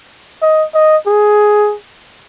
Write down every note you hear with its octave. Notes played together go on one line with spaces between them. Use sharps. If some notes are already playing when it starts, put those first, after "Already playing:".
D#5
D#5
G#4